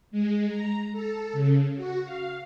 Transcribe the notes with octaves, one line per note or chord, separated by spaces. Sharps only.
G#3
A#5
A4
C#3
F#4
F5